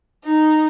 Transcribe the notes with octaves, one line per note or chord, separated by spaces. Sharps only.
D#4